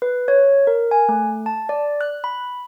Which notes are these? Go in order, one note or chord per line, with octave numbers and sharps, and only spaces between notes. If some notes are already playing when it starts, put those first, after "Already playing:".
B4
C#5
A#4
G#5
A3
A5
D5
F#6
B5